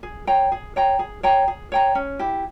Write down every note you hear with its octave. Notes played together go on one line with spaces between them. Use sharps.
G#4
C#5 G5 A#5
G#4
C#5 G5 A#5
G#4
C#5 G5 A#5
G#4
C#5 G5 A#5
C#4
E4 G4